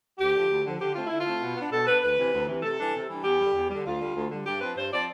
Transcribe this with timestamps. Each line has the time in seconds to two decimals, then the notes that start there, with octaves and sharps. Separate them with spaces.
0.18 D2 G4
0.33 D3 F3
0.48 D2
0.64 D3 F3
0.79 D3 G4
0.93 A3 C4 F4
1.06 D3 E4
1.19 F4
1.25 A3 C4
1.40 B2
1.55 B3 D4
1.71 B2 A4
1.86 B3 D4 B4
2.01 D2 B4
2.16 C3 E3
2.32 D2
2.47 C3 E3
2.62 C3 A4
2.78 E3 G3 D4
2.93 C3
3.08 E3 G3 D4
3.23 E2 G4
3.38 D3 G3
3.53 E2
3.69 D3 G3
3.85 D2 F4
3.99 D3 G3
4.15 D2
4.29 D3 G3
4.45 G2 G4
4.60 F3 C4 B4
4.76 G2 C5
4.91 F3 C4 D5